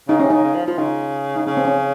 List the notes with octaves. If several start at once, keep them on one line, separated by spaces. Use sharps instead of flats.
C#3 D#4
C3 C#4
C#3 D#4
C#3
F3
F3 F4
C#3 D#4
D#4
C#3 C#4
C4
C#4